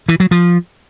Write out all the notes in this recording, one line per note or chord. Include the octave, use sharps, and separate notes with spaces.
E3
F#3
F3